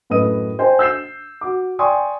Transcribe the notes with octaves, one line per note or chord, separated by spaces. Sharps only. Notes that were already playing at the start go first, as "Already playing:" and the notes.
F#2 A2 B4 D#5 D#6 D#7
C5 D#5 G5 G#5
E6 G6 C7 E7
F#4 D6
D5 G5 G#5 C6 C#6 D#6